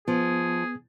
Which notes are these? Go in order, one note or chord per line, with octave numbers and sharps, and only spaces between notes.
F3 B3 G#4